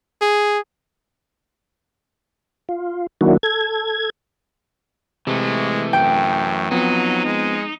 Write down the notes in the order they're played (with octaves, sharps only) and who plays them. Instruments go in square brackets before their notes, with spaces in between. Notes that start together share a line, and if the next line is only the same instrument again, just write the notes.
[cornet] G#4
[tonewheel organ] F4
D#3 F#3 A#3 D4 E4 F#4
A4 G#6
[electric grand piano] C3 [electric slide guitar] E3 A3 [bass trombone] G#3
[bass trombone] F#2 [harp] G5
[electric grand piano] F3 B3 C4 [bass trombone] F#3 [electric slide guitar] D#4
[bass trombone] G#3